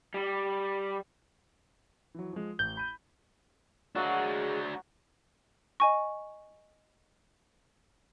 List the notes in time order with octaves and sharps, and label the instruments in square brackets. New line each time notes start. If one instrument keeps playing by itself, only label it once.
[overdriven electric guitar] G3
[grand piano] E3 F#3
F3 G#3
[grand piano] A1 [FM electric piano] G6
[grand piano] B5 D#7
[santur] F#3 A#4 F#5 [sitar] G#3 A#3 [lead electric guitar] D4 F#4
[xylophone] D#5 G#5 C#6